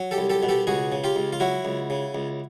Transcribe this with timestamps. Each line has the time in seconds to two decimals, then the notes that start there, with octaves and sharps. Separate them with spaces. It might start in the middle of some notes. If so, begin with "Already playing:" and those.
Already playing: F#3
0.11 G4 A4
0.18 C2
0.30 G4 A4
0.43 B2
0.49 G4 A4
0.67 C#2 F#4 G#4
0.92 C#3
1.04 F4 G4
1.16 C#2
1.33 F4
1.40 F#3 E4 F#4
1.65 C#2
1.90 C#3
2.15 C#2